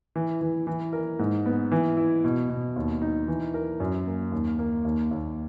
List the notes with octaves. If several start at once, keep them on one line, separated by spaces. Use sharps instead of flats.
E3
E3
E3
A#4
G#2
B3
E3
E4
B2
B2
D#2
D#4
E3
A#4
F#2
A#3
D#2
A#3
D#2
D#2